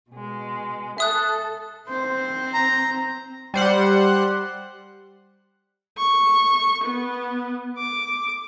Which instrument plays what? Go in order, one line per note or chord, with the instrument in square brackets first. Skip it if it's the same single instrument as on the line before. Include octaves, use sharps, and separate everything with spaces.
[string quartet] B2 G#3
[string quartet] A4 [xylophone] E5 D#6 F#6
[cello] C4 [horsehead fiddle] C5
[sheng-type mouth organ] A#5
[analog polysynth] G3 C5 F#5
[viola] C#6
B3
D6